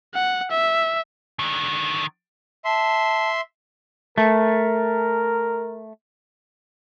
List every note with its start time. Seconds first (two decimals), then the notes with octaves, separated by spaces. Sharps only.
0.14 F#5
0.51 E5
1.39 D3 D#3
2.65 E5 A5 C6
4.18 A3 A#4